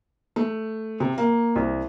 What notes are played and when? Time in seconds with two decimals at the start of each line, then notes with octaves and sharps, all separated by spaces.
0.36 A3
1.00 C3
1.18 A#3
1.56 C2